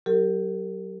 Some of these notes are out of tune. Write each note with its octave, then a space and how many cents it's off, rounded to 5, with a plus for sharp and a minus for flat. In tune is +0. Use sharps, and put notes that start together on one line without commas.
F#3 +25 G4 +0 A#4 -30